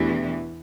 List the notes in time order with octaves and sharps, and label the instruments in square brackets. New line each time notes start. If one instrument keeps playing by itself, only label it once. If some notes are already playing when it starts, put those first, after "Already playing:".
Already playing: [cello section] E2 E3 [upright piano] B2 A3 D4 G4